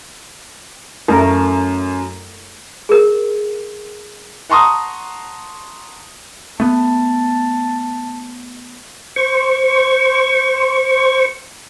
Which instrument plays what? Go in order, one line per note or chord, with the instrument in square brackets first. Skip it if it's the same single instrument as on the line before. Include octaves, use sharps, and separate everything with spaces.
[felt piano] F#2 [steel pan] A3 A#4
[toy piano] G#4 A#4
[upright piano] F#5 A5 A#5 C6 C#6 D#6
[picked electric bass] A3 B3 [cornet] A5
[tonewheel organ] C5 C#6